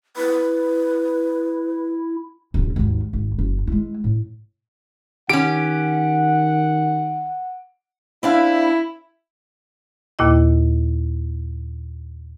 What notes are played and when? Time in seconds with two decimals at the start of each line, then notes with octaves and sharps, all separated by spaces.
0.17 E4 B4
2.54 D1 C#3
2.76 G#1 D#2
3.13 G#1
3.38 F#1
3.67 G#3 E4
4.04 A2
5.29 D#3 C#4 G4 F#5 D7
8.23 C4 D4 E4 F5
10.19 D#2 A#2 A#3 E4 D#5